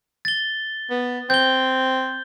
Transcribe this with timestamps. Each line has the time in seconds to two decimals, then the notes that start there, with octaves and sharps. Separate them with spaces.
0.25 A6 G7
0.90 B3
1.30 C4 G6 G7